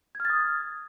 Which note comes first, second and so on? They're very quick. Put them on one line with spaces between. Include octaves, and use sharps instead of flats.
G#6 F6 A6 D#6